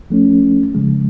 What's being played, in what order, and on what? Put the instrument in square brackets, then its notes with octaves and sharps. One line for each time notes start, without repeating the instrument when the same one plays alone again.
[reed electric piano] F3 A3 C#4
C#3 F3 G#3